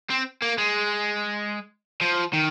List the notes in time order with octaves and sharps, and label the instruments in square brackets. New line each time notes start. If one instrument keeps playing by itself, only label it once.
[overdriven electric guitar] C4
A#3
G#3
F3
D#3